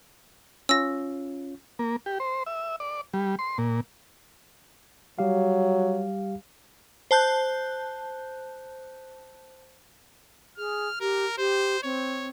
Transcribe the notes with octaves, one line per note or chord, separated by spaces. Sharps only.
C#4 F4 E6 A#6
A#3
G4
C5
E5
D5
G3
C6
A#2
F#3 G3 G4 F5
C5 A5 F#6 G6
G#4 F6
G4 A#4
G4 C5
C4 C#5